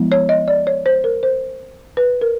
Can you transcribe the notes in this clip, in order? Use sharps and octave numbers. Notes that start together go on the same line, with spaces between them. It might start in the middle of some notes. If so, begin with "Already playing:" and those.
Already playing: F3 G#3 B3 E4
C#5
D#5
D5
C#5
C5
A#4
C5
B4
A#4